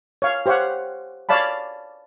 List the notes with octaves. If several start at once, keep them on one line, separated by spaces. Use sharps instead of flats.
C#5 F5
G4 C5 C#5 F5 F#5
C#5 D5 F5 A5 B5